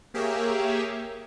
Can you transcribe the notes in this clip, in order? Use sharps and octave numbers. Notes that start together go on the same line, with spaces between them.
A#3 G4 G#4 A#4 C#5 E5